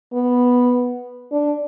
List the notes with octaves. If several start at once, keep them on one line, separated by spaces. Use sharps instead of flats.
B3
D4